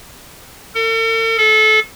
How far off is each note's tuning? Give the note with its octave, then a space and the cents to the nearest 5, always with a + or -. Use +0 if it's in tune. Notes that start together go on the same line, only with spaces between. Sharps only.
A4 +45
A4 -25